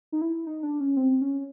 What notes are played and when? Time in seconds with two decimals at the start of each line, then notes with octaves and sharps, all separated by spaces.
0.12 D#4
0.22 E4
0.46 D#4
0.63 D4
0.80 C#4
0.96 C4
1.21 C#4